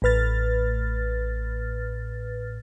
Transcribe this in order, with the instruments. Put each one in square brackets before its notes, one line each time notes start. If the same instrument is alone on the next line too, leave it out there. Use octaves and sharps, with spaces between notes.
[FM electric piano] A1 A2 B4 F6 A6